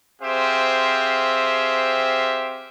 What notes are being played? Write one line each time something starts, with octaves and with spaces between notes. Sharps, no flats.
C4 G4 G#4 C5 E5 F5